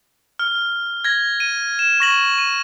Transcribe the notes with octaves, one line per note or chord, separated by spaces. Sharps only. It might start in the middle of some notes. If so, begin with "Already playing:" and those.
F6
G#6 A#6
D#7
E7
C#6 A#6 F#7
D#7